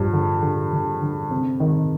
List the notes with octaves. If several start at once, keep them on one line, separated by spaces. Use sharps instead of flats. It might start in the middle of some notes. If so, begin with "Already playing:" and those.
Already playing: G2 F3
D3
D3
D3
D3
C3
D#3